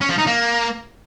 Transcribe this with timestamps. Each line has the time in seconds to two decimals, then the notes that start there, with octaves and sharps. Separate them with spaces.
0.01 C#4
0.10 F3
0.18 D#4
0.27 A#3